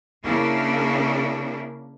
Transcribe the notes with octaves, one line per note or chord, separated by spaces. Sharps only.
C#3 A#3 D4 E4